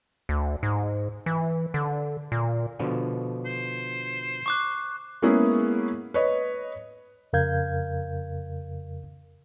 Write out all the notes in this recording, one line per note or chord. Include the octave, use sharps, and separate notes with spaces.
D2
G#2
E3
D3
A#2
B2 D3 F3
C5
C#6 D6 F#6
G#3 A#3 B3 C#4 E4 G#4
B4 C#5 D#5
F2 C#3 A#4 F5 G6 G#6